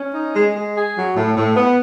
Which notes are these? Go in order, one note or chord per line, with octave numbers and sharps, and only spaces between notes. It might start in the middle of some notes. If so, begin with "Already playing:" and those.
Already playing: C#4
D#4
G#3
G#3
G#4
F#3
A2
A2
B3